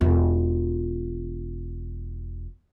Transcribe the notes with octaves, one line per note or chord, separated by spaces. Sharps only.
E1 F4